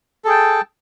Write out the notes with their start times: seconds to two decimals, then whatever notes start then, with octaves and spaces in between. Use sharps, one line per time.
0.25 A4
0.27 G#4
0.30 G5
0.32 A5